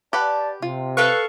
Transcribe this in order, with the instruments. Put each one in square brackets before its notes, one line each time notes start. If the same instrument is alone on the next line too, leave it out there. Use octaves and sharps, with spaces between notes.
[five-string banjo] G4 B4 F#5 [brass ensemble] D5 A5
[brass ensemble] C3 [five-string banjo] F4
[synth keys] A4 F5 C#6 [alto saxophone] B4